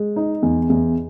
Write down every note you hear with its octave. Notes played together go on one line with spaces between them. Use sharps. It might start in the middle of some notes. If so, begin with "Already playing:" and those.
Already playing: G#3
D#4
E2
E2